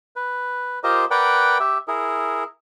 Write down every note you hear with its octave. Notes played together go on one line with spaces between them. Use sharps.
B4
F4 G4 A#4 C5 D#5
A#4 B4 D5 F#5 G5
G4 E5
E4 G#4 A#4